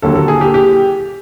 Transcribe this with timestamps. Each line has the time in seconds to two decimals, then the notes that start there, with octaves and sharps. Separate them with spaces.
0.02 D#2 D3 F#3 A#3 A4
0.15 A4
0.28 G#4
0.41 G4
0.54 G4